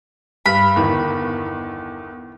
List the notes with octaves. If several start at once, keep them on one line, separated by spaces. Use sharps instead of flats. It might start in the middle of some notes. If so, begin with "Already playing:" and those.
G2 B5
G1 E2 D#3